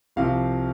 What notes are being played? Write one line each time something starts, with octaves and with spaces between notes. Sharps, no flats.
C2 C3 F3 F5